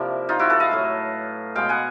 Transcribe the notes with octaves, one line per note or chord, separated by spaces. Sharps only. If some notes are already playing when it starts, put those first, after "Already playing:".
Already playing: C3 F3 A#3 D4 E4
D#4 F4
E4 F#4
A4 B4
D#5 F5
A2 F#3 A3
B2 G#3 B3 F5 G5
F#5 G#5